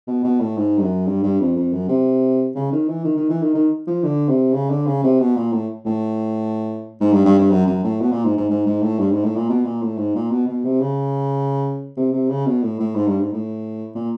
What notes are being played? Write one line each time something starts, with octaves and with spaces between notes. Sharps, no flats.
B2
B2
A2
G#2
G2
F#2
G2
G2
F2
F2
F#2
C3
C#3
D#3
E3
D#3
D#3
E3
D#3
D#3
F3
D3
C3
C#3
D3
C#3
C3
B2
A#2
A2
A2
G#2
G2
G2
G2
F#2
F#2
A2
B2
A#2
G#2
G#2
G#2
G#2
A2
G2
G#2
A2
A#2
B2
A#2
A2
G#2
A#2
B2
B2
C3
C#3
C3
C3
C#3
B2
A2
A2
G#2
G2
G#2
A2
A#2